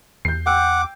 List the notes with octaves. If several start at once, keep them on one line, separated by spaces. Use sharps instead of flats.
E2 G6 C7
F#5 G5 D6 E6